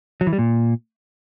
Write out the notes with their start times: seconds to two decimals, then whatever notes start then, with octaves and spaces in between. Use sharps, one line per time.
0.21 F#3
0.27 E3
0.33 G3
0.39 A#2